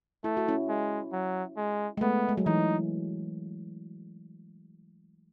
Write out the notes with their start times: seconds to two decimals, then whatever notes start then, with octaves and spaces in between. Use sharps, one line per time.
0.24 A3 E4
0.37 F#4
0.48 C#4 E4
0.69 G#3
1.13 F#3
1.57 G#3
1.97 G#3
2.01 A3 B3
2.29 G#3
2.37 F#3
2.46 E3 D#4